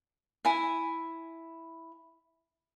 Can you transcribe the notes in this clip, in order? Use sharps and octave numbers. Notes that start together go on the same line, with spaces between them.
E4 G#5